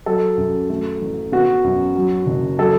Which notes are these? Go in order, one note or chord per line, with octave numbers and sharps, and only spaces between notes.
F#3 A4
F#2
A3
A1
B3 F#4
F#2
F#3
F#1
F#3 A4